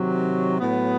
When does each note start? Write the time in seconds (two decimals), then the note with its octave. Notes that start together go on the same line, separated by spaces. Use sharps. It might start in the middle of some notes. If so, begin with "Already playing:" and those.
Already playing: C3 D#3 F#3
0.59 A2 F#3 B3